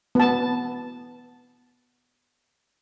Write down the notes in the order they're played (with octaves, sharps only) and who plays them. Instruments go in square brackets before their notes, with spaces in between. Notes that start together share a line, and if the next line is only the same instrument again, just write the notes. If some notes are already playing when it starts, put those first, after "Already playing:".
[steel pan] B3 A5